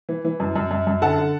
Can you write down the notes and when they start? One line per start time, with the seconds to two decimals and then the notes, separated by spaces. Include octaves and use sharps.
0.09 E3
0.25 E3
0.40 F#2
0.56 F#2
0.71 F#2
0.87 F#2
1.02 D3 F#5 A5
1.18 D3